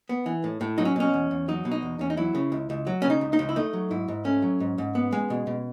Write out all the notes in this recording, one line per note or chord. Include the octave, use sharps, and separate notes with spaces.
B3
E3
A2
A2
F#3 D#4
C#4
B2 C#4
E2
E2
F#3 D#4
B2
D#4
E2
E2 C#4
D#4
F#3 E4
C#3
C#2
C#2
F#3
C#3 C#4
D#4
C#2
D#4
C#2
E4
A3 D#4
F#3
G#2 E4
G#2
A3 C#4
F#3
G#2
G#2
B3
G#3
B2
B2